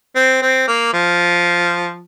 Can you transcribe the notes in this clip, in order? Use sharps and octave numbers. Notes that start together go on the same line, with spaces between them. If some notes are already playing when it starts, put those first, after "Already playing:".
C4
C4
A#3
F3